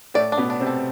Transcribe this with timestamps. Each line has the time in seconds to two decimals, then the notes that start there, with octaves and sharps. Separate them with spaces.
0.14 A2 A3 D5
0.32 D4
0.37 B2 B3
0.50 D4
0.60 C3 C4
0.67 A4